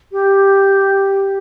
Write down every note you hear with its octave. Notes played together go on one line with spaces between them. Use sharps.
G4